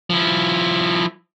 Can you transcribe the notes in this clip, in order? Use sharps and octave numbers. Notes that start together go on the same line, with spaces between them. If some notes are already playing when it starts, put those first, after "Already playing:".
F3 E4